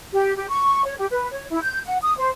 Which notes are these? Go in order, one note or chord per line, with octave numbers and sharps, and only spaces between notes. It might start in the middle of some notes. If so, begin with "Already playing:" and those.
G4
G4
C#6
C#5
G4
B4
C#5
E4
G6
F#5
D#6
C5